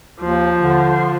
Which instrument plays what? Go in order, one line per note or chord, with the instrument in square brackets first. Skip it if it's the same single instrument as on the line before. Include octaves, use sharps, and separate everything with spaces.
[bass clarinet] D#2 [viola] F3
[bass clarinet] D3